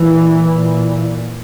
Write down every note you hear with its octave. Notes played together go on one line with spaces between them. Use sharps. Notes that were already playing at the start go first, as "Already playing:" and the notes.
Already playing: A#2 E3
A#2